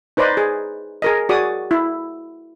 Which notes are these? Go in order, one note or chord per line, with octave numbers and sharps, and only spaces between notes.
D#4 B4 C5 D5 D#5
G#4
G#4 A#4 D#5
F#4 G#4 D5 D#6
E4